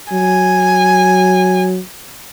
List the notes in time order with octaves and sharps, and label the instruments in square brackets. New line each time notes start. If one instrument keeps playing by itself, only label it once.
[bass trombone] F#3 [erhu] G#5